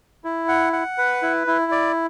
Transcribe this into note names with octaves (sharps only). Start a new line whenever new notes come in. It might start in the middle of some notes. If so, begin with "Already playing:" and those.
E4
F#5
F#5
B4
E4
E4
D5